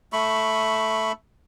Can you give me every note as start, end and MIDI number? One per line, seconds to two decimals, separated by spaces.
0.13 1.12 57
0.13 1.12 83
0.13 1.12 85